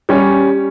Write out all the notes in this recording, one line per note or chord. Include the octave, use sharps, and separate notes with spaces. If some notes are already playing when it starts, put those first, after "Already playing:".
G3 C#4 G4